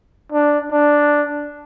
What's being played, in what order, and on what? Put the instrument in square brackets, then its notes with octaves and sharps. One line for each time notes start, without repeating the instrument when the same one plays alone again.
[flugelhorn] D4
D4